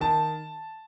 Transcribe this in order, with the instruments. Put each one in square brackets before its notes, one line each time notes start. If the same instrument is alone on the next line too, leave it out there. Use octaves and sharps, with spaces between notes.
[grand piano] D#3 A5